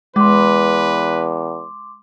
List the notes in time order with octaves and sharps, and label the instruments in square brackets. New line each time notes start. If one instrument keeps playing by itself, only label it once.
[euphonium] E2 [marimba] G#3 [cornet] B4 [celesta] C6 D6